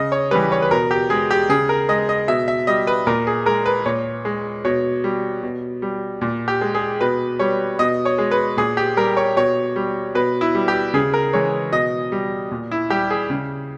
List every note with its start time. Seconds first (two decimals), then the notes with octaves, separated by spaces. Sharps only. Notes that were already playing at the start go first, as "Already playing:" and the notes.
Already playing: C#3 D#5
0.12 C#5
0.31 E3 G3 B4
0.52 C#5
0.62 B4
0.71 B2 A#4
0.91 G4
1.10 G#3 G#4
1.31 G4
1.49 C#3 G#4
1.69 A#4
1.89 G#3 D#5
2.09 D#5
2.28 B2 E5
2.48 E5
2.67 G3 D#5
2.87 B4
3.07 A#2 A#4
3.27 G#4
3.46 G#3 A#4
3.66 B4
3.86 A#2 C#5
4.25 G#3
4.65 B2 C#5
5.04 G3
5.43 B2
5.82 G3
6.21 A#2
6.48 G4
6.61 G#3
6.75 G#4
7.01 B2 B4
7.39 G3 C#5
7.79 B2 D#5
8.05 C#5
8.18 G#3
8.31 B4
8.57 A#2 G#4
8.77 G4
8.97 G3 A#4
9.17 C#5
9.36 B2 C#5
9.76 G3
10.15 B2 B4
10.41 E4
10.55 G3
10.68 G4
10.94 C#3 G#4
11.13 A#4
11.33 E3 G#3 C#5
11.72 B2 D#5
12.12 G3
12.51 A#2
12.71 E4
12.90 G3 G4
13.10 G#4
13.30 C#3